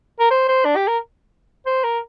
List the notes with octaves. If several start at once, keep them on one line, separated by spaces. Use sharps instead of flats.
A#4
C5
C5
D4
G4
A#4
C5
A#4